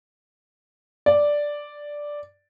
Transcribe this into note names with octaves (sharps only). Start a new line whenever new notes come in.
D5